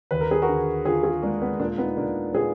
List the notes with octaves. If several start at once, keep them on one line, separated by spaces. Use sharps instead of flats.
D#2 B4
A#4
G#4
F#4 A#4
D3
D3 F4 G#4
F4 G#4
G#3 A#3 D4
B3
A#2 A#3 D4
B3 D#4
A#2 A#3 D4
A#2 G#4 B4